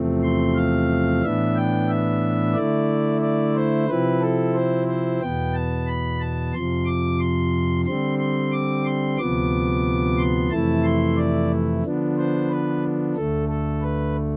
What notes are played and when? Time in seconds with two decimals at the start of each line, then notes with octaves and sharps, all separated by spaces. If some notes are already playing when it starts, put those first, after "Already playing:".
Already playing: E2 C3 F3 A3 C4
0.23 C6
0.56 F5
1.23 A2 E3 B3 D4 E5
1.56 G5
1.88 E5
2.54 D3 A3 E4 D5
3.22 D5
3.55 C5
3.88 C3 F3 C4 E4 B4
4.21 A4
4.54 C5
4.87 C5
5.20 E2 B2 B3 G5
5.54 A5
5.87 B5
6.20 A5
6.53 F2 C3 F3 C6
6.86 D6
7.20 C6
7.85 D3 G3 C4 C6
8.19 C6
8.52 D6
8.85 C6
9.18 D2 C3 F3 B3 D6
10.18 C6
10.50 F2 C3 E3 A3 E4 A5
10.84 C6
11.17 D5
11.83 D3 F3 B3 D4
12.17 C5
12.50 B4
13.16 D2 D3 A3 A4
13.49 A4
13.82 B4